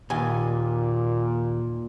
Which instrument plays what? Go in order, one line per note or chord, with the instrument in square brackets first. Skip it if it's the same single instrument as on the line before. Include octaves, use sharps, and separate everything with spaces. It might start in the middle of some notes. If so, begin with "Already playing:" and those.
[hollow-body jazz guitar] D#2 G#5 [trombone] A#2